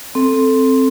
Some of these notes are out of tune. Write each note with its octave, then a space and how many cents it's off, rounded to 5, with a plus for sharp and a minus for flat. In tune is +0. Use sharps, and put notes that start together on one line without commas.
C4 +0 A4 +0